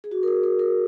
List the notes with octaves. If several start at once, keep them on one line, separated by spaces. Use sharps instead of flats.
G#4
F#4
A#4
G#4
A#4
A#4